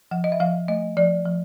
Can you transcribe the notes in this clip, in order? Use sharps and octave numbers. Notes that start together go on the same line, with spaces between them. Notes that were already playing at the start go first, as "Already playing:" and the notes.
F3 F#5
D#5
E5
F3 F5
A3 D#5
F3 D5
F3